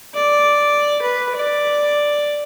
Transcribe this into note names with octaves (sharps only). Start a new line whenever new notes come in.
D5
B4
D5